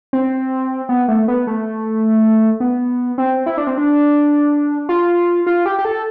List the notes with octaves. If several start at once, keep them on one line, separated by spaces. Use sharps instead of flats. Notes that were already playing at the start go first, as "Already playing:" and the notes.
C4
B3
A3
B3
A3
B3
C4
E4
D4
C4
D4
F4
F4
G4
G4
A4